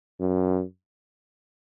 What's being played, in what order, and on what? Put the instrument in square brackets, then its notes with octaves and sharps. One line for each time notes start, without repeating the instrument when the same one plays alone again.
[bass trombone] F#2